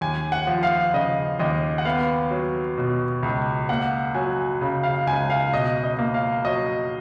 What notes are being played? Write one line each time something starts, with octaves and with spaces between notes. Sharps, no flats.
D#2 G#5
F#5
F3
F5
C#3 D#5
D#2 D#5
F#5
B3 F5
F#3
B2
C#2
A#3 F#5
F#3 G#5
C#3
F5
C#2 G#5
F5
B2 D#5
D#5
A#3
F5
F#3 D#5